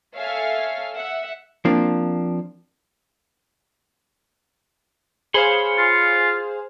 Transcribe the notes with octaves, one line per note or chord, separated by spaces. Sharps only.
A4 C#5 E5 F5 G#5 F6
E5 F#5
F3 A#3 C4 D4
G#4 C5 C#5 F5 B5 C6
F4